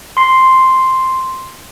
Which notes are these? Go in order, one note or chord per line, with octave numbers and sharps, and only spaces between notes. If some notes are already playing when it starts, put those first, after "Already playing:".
C6 C7